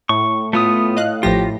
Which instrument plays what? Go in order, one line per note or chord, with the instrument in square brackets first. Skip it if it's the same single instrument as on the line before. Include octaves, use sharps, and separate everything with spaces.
[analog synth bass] A2 [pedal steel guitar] C#6
[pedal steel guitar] A3 B3 D#6 [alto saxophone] F4
[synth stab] D#5 F5 F#6
[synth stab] A1 F3 A#6 [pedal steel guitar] F4 [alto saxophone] G4